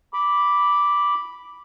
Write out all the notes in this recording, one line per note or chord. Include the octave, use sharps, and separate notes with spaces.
B5 D6